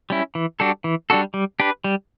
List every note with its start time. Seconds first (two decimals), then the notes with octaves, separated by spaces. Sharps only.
0.10 G3 C#4 E4
0.35 E3
0.60 G3 D4 F#4 A4
0.84 E3
1.10 G3 D4 F#4 A4
1.34 G3
1.60 D4 G4 B4
1.84 G3